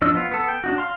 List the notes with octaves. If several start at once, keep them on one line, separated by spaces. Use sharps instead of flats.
F3 D4 D#5 E6
B3 F4
B3 A4
G5
D4 D#4 F#4
F5 C6